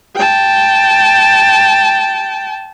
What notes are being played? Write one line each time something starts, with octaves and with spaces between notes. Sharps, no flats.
G5 A5